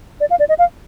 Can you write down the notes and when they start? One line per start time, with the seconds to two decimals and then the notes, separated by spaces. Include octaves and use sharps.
0.20 D5
0.30 F5
0.39 D5
0.49 D#5
0.59 F5